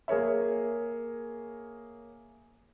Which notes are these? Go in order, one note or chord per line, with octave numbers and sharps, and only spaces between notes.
A#3 G#4 A#4 C#5 E5